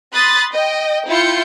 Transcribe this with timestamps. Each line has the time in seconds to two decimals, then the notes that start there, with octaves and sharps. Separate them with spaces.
0.13 B5 C6 D#6 F#6 A6
0.52 D#5 G5
1.08 E4 F4 G5 C6 G6 C#7